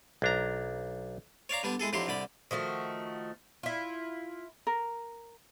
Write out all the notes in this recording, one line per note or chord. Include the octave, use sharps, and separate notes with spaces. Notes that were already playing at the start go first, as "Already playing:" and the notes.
B1 D4 A#5
C#5 D5 F5 A#5
D3 G3 B3 D4
G#3 E4 G#4 A4
F2 D3 F#3 E4 G4 C6
C2 D3 D5 B5
D#3 F3 A3 F#4
E4 F4
A#4